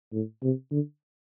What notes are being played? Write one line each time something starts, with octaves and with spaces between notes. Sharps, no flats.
A2
C3
D3